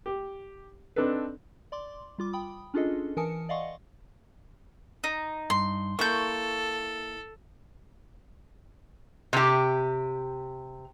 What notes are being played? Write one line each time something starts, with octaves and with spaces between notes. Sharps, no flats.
G4
C4 D4 D#4 A4 B4
D5 C6 D6
G3 F4 D6
G5 B5 D#6
C#4 D4 F4 G#4 A4 D#5
E3 A#4 G#5 A5 D#6 C#7
D5 D#5 F5 F#5 C6 C#6
D#4
G2 C6
A#3 E4 A4 A#4 C#6 G6
C3 G4